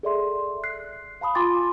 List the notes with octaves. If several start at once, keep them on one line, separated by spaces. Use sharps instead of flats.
G#4 A4 D5 E5 C6
F#6 C7
F5 A5 B5 D#6
F4 G#5 C6 D6 A6